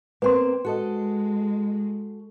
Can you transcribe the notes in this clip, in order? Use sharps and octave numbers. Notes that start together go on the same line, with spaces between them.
A#3 C4 B4 C5 C6
G#3 F#4 A4 D#5